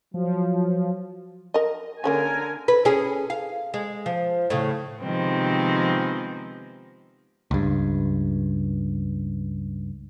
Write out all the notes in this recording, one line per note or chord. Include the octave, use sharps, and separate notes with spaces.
F3 F#3
A#4 D#5
D3 A#3 C#4 G#4 A#4 G#5
B4
C#4 G#4
F5
G#3
F3
A2 C#3
C3 D#3 F3 G#3 B3 C4
C#2 G2